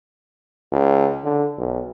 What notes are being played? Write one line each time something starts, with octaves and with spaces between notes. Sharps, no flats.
C#2
D3
B1